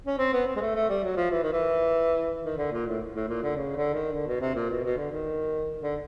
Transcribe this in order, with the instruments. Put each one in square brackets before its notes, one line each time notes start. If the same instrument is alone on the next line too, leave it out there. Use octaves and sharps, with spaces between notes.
[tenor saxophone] C#4
C4
B3
C4
G#3
A3
A3
G3
F#3
F3
E3
D#3
E3
D#3
D3
A#2
A2
A2
A#2
D3
C#3
D3
D#3
D3
B2
C3
A#2
B2
B2
D3
D#3
D3